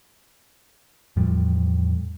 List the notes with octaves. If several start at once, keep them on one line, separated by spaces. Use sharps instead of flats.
E2 A2 F3 G3